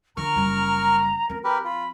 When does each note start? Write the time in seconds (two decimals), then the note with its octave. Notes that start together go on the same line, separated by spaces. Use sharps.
0.17 D3 F3 A#4 A#5 C#6 F6
0.36 F#1 G3
1.29 F3 C4 A#4
1.44 G4 A#4 B4 B5
1.64 F4 B5